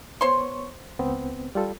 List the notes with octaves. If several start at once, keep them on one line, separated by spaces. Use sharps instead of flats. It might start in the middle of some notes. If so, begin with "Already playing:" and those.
B3 C5 C#5 C6 C#6
C#2 B3 C4
G3 F4 A4